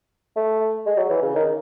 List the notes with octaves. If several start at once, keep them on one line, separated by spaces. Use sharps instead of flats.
A3
G#3
F#3
E3
C#3
D#3